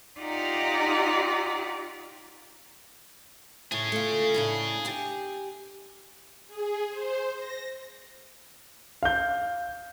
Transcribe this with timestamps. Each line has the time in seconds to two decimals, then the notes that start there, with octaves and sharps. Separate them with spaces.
0.19 D#4 F4 G4 D5 F#5 A#5
3.72 A2 G#4 C#5
3.92 A3 F4
4.34 A2 C#3 D4
4.85 G4 G#5
6.47 G#4
6.89 C5
7.37 A#6
9.03 F5 G6